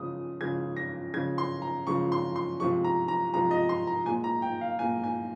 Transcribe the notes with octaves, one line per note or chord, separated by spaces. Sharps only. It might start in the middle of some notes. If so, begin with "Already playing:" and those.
Already playing: C#3 F3 G#3 D#6
C#3 F3 G#3 G#6
A#6
C#3 F3 G#3 G#6
C6
A#5
C#3 F3 G#3 C#6
C6
C6
C3 F3 G#3 C#6
A#5
A#5
C3 F3 G#3 A#5
D#5
C6
A#5
A#2 G#3 G#5
A#5
G5
F5
A#2 G#3 G#5
G#5